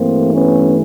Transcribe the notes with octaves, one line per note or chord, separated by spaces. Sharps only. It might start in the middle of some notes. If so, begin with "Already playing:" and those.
Already playing: G2 E3 A3 A#3 C4
B3 C#4